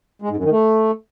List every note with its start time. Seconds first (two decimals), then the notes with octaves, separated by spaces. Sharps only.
0.22 G#3
0.29 G#2
0.37 F#2
0.44 D#3
0.51 A3